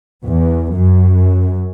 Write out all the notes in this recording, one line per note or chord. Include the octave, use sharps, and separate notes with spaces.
E2
F#2